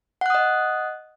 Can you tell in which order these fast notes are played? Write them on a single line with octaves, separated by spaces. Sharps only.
F#5 F#6 D#6 D#5